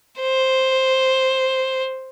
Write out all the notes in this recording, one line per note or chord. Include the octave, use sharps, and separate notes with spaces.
C5